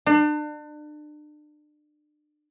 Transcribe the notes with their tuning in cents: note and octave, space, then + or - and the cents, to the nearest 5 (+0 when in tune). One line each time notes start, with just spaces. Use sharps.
D4 +35